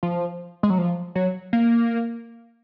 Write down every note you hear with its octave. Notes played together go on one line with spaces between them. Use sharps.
F3
G#3
F#3
F3
F#3
A#3